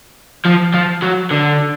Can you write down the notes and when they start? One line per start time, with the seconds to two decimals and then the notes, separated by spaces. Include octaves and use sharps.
0.45 F3
0.74 F3
1.02 F#3
1.31 D3